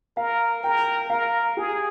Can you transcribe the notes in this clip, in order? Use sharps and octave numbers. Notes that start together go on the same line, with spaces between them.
A#4 F5
A#4 G5
A#4 F5
G4 G#4